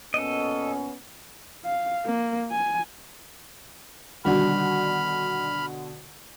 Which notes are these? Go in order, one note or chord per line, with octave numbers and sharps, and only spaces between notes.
A#2 B3 C#4 A4 D#5
F5
A#3
G#5
B2 D3 D#3 G3 D4 F#4 B5 F6